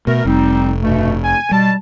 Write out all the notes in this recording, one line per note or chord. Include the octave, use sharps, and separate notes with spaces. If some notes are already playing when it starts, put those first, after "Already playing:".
B2 A3 A#4
F1 G3 C4 D#4
G2 B2 A3
G#5
B2 G3 A5